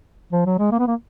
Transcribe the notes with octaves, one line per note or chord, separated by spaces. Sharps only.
F3
F#3
G#3
A#3
B3
A#3